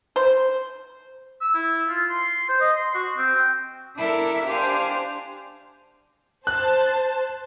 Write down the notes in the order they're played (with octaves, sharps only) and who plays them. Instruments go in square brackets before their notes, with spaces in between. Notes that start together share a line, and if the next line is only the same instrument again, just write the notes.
[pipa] C5
[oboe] E6
E4
F4
C6
C5
D#5
C6
F#4
C4
G5
[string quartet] D4 E4 A4 A#4
D4 G4 C5 F5 G#5
[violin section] C5 A5 [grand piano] F#6